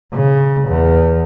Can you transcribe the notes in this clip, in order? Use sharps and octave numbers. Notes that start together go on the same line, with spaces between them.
C#3
E2